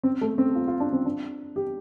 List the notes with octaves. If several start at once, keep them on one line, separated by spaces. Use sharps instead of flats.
C4
A3
C4
F4
F4
D4
C4
D4
G4